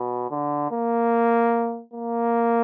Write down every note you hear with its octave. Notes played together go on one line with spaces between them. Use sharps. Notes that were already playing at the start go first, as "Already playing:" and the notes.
Already playing: B2
D3
A#3
A#3